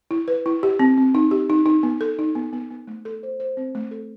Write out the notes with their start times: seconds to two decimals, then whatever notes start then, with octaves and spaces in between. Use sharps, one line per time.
0.11 E4
0.28 B4
0.46 E4
0.63 G4
0.79 C4
0.98 C4
1.15 D#4
1.31 G4
1.50 D#4
1.66 D#4
1.83 B3
2.01 A4
2.19 D#4
2.35 B3
2.53 B3
2.70 B3
2.87 A3
3.05 A4
3.23 C5
3.40 C5
3.57 C4
3.75 A3
3.91 A4